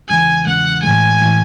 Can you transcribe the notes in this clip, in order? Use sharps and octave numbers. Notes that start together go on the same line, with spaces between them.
E2 C#3 E3 G#3 G#5
E2 C#3 E3 G#3 F#5
A2 E3 G#3 G#5
A2 E3 G#3